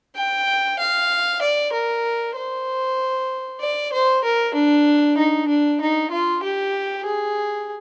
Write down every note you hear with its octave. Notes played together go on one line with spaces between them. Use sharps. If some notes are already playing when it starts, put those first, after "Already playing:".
G5
F5
D5
A#4
C5
D5
C5
A#4
D4
D#4
D4
D#4
F4
G4
G#4